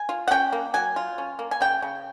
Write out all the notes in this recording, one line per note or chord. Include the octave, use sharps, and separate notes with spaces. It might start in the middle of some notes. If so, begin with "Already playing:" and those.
Already playing: G#5
F4
F#5
C#4 G5
A#3
F#3 G#5
F4
C#4
A#3
G#5
C#3 G5
C#3